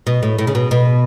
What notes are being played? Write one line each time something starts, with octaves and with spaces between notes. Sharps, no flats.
B2
A2
A2
C#3
B2
B2